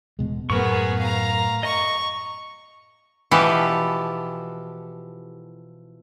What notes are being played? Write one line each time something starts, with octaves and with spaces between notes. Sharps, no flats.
E1 B2 G#3
F#2 A2 B3 G#4 A#4 C#6
F5 A#5
D#5 A#5 C#6
B2 E3 F3 E4 G4 A4